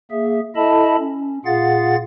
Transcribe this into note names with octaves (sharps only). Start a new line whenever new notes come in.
A#3 G#4 E5
E4 A4 D#5 E5 A5 B5
C#4
A#2 F4 G#4 F5 F#5 A6